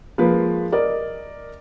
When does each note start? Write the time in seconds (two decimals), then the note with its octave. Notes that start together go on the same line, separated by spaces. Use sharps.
0.18 F3 G#3 A#3 B4
0.72 A#4 D5 D#5